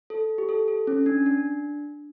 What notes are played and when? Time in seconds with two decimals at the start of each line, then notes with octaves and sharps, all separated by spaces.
0.10 A4
0.38 G4
0.49 A4
0.68 A4
0.87 C#4
1.06 D4
1.26 D4